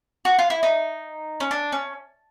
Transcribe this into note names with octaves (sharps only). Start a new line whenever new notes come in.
F#4
F4
E4
D#4
C#4
D4
C#4